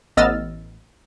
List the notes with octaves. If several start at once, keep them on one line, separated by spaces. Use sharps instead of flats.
A1 B3 D#5 E6 F6 A6